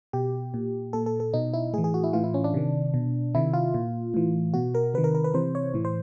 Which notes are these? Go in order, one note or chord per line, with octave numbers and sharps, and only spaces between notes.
B2 G4
A#2
A#2 A4
A4
A4
B2 D#4
E4
A2 E3 G#4
G#4
F#4
E4
A2 E3 F4
E4
C#4
D4
C3 D#3
B2
C3 D#3 E4
F4
A#2
A2 E3
B2 F#4
A#4
C3 D#3 B4
A#4
A#4
B4
C3 E3 C5
C#5
A2 E3
C5